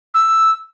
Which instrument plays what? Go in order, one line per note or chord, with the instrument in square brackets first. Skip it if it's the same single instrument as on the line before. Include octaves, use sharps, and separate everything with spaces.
[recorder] E6